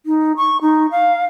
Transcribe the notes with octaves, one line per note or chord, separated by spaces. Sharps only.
D#4
C#6
D#4
F5